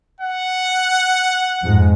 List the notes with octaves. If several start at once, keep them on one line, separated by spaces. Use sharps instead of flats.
F#5
F2 G#2 G#3